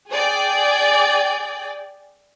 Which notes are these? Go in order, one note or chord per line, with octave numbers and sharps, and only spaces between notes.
G#4 D5 G5